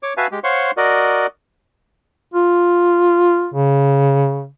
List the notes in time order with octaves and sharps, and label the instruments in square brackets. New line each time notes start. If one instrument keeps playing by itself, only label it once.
[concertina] C#5 D6
F#4 B4 E5 F5 G#5 A5
G#3 G4
C5 C#5 F5 F#5 C6 C#6
F#4 A#4 D5 D#5
[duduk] F4
C#3